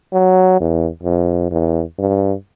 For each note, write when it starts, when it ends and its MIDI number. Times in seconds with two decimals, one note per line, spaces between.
0.13 0.60 54
0.60 0.88 40
1.03 1.50 41
1.51 1.82 40
1.98 2.33 43